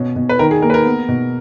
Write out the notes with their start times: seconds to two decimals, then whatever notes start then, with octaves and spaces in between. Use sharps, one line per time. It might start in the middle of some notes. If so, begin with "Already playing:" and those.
Already playing: B2 C#4
0.16 B2
0.29 B4
0.39 D#3 A#4
0.51 G#4
0.62 A#3 A#4
0.70 B4
0.74 A#4
0.85 B3
1.08 B2